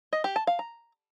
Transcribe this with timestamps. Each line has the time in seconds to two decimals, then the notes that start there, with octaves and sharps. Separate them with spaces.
0.13 D#5
0.24 G4
0.36 A5
0.47 F5
0.59 A#5